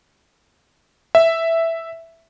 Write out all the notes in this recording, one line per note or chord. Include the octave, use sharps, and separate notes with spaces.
E5